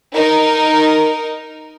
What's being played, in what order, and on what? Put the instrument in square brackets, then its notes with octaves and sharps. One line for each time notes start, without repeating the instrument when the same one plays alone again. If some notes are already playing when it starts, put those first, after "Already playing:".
[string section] D#4 A#4